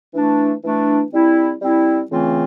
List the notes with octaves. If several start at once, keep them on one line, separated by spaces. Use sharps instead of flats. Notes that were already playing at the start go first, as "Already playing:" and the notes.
E3 A3 D4
E3 A3 D4
G3 C4 E4
G3 C4 E4
C#3 E3 A3 C4 F4